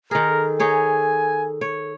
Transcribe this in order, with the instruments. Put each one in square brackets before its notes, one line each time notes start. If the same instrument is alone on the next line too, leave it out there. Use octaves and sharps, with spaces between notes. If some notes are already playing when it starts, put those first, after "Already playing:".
[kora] D#3 G#4 [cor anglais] A#4
[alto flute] A4
[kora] D#4 G#4 C#5 [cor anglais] G#5
[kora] C#5